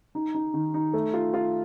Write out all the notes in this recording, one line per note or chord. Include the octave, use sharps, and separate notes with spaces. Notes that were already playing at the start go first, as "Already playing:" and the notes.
D#4
D#4
D#3
D#4
A3
F4
F4